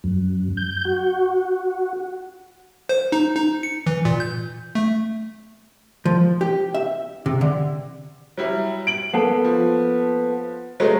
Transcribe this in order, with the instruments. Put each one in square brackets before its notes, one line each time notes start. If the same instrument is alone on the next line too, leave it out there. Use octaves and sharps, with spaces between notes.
[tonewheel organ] F#2
G6
F#4
[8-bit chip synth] C5
D#4
D#4
C#7
E3
A#2
G6
A3
[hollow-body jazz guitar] F3
G4
E5
C3
D3
[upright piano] F#3 G3 E4
D7 F#7
[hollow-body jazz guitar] A#3 B3 A4
[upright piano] F3
F#3 G#3 A3